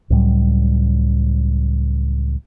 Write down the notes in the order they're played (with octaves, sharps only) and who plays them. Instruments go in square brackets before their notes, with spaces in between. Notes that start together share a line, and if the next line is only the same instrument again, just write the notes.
[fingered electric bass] C#2 A2 F#3 G3